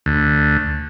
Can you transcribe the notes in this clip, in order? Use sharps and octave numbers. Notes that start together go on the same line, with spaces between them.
D2